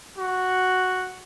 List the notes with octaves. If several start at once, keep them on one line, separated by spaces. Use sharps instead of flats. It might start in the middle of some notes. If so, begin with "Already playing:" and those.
F#4